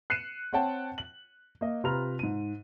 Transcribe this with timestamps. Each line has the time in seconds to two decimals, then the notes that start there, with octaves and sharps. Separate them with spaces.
0.10 F#6 C7 C#7 D#7 E7
0.53 C4 C#5 F#5 G5 A5
0.98 F#7
1.61 A#3 D#5
1.84 C3 F4 B4 A#5 F6 F7
2.19 G#2 D#7